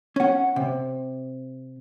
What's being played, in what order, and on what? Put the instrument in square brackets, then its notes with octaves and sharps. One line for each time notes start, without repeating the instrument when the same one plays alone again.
[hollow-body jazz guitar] C#4 F#5
C3